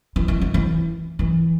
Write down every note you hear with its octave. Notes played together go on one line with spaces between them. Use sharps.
E3
E3
D#3
E3
E3